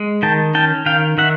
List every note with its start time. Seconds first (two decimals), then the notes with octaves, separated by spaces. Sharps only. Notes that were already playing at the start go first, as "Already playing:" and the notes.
Already playing: G#3
0.23 D#3 G5 A5
0.54 C#4 G5 A5
0.86 D#3 F5 G5
1.18 D#3 E5 F#5